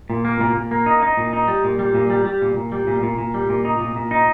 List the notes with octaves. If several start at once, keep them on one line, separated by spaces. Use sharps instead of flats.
A#2
A#3
A#2
A#2
A#3
D#4
D#4
A#2
D#4
G3
A#2
G3
A#2
G3
G3
A#2
A#2
G3
A#2
A#2
A#2
G3
A#2
D#4
A#2
A#2
D#4